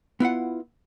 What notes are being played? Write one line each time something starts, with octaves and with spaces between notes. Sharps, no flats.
B3 E4 F4 F#5